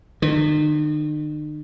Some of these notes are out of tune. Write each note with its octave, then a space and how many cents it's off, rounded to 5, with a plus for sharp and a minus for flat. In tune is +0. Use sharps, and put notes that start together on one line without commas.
D#3 -45